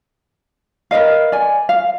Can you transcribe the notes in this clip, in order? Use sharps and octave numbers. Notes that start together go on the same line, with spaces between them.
A#4 B4 D#5 F5
D5 G#5
F5